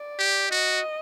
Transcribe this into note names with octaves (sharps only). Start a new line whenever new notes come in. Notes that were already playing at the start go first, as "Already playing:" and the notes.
Already playing: D5
G4
F#4 D#5